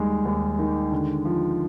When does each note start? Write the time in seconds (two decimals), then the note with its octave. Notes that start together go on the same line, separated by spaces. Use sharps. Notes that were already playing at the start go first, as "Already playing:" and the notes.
Already playing: D#2 D#3 G3 G#3
0.25 D#2
0.59 D#3
0.91 D3
1.25 F3